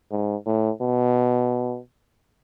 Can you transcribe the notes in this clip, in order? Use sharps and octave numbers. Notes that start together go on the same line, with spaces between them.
G#2
A2
B2